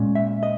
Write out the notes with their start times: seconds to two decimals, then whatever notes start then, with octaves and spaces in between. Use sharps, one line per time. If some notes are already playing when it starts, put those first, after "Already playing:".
Already playing: A#2 G#3 C#4
0.15 E5
0.43 D#5